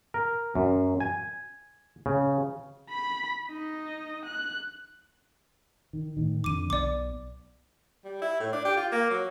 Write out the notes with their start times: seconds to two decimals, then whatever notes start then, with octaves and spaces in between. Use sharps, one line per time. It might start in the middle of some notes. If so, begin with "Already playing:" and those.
0.14 A#4
0.55 F#2
1.00 G#5
2.06 C#3
2.90 B5 B6
3.51 D#4 D#5
4.26 F#6
5.93 D#3
6.17 A2 C3 D#3
6.44 F2 D3 D6 D#7
6.70 B1 B2 D5 D6
8.05 G3
8.22 E4
8.40 A2
8.53 D4
8.65 G4
8.77 F4
8.92 A#3
9.10 F#3